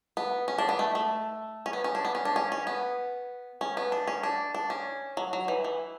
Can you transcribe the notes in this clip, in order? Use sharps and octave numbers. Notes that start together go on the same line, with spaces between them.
B3
C#4
D4
B3
A3
A3
C#4
B3
C#4
D4
B3
C#4
D4
C#4
C#4
B3
C#4
B3
D4
C#4
D4
D4
C#4
F#3
F#3
E3
E3